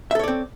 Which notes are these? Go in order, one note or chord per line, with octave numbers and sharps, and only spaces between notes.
C4 A4 C#5 D5 E5